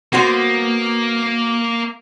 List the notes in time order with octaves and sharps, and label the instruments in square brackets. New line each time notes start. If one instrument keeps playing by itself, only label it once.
[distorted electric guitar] A#3 [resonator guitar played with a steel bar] B3 F#4 C5